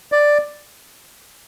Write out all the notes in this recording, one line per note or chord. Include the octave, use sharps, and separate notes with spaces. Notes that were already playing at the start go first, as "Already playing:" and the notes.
D5